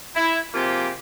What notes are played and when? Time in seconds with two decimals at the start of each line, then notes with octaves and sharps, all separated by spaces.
0.16 E4
0.54 C3 F3 A#3 F4 G4 G#4